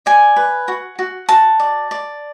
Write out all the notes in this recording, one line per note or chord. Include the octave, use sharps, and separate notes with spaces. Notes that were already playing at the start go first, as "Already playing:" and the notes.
D5 G#5
B4
F#4
F#4
F#4 A5
D5
D5